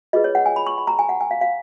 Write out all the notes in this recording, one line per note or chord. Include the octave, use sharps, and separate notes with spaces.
F4 G#4 B4 D#5
C#5
F#5
G#5
B5
C#6
B5
A#5
G#5
F#5
G#5
F5
F5